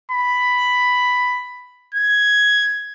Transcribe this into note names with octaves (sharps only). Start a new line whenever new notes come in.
B5
G#6